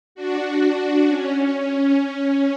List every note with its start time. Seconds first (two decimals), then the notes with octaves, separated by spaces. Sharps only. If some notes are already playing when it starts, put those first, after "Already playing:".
0.15 D4 F#4
0.62 D4
1.08 C#4